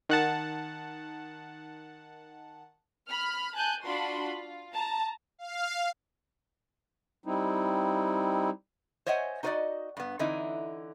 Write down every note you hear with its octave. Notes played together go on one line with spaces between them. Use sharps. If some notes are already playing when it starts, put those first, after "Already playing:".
D#3 F#5 A5
B5 F6
G#5 A5 F#6 G6
D4 F4 F#4 B5 C6
F4
A5 A#5
F5
G3 C4 D#4 E4
C5 C#5 D#5 E5 F#5 G#5
D#4 F#4 B4 C5 D5 D#5
G2 B3
D3 E3 C4 D#4 E4